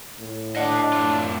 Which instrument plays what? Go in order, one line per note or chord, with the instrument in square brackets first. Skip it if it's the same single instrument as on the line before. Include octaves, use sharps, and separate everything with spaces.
[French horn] A2
[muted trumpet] D4 [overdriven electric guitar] D#5 F#5
[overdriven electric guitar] A3 F4